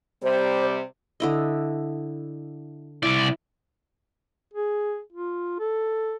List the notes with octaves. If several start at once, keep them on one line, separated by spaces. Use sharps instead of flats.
C3 G3 C5
D3 E4 D#5
C2 E4 D5
G#4
F4
A4